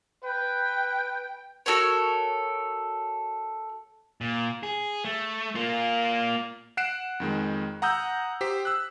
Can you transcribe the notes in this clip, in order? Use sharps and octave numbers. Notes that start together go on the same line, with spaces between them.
B4 G5
F#4 A4 A#4 C#5
A#2
G#4
A3
A#3 F4
F#5 F#6 C7 D7 E7
F2 D#3 G#3
F#5 A#5 D#6 E6 G6
G4 C5 B6
E6 F#6